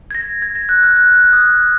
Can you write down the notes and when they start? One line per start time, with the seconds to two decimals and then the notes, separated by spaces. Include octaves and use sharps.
0.11 G#6
0.15 A#6
0.42 G#6
0.55 A#6
0.69 F#6
0.83 F6
0.97 F#6
1.15 F#6
1.33 D#6